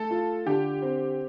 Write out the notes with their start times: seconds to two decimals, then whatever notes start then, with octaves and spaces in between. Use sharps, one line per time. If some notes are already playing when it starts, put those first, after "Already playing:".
Already playing: A3 A4
0.10 F4
0.46 D3 G4
0.82 C4